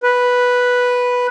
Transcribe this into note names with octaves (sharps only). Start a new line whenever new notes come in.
B4